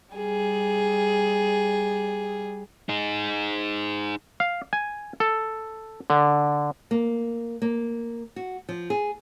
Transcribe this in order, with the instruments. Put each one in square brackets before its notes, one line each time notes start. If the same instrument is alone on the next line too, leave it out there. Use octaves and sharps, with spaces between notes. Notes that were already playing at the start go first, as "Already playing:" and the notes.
[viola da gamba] G3 G#4
[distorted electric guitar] D#4 G#4
[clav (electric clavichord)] F5
G#5
A4
D3
[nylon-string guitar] A#3
A#3
F#4
F3
G#4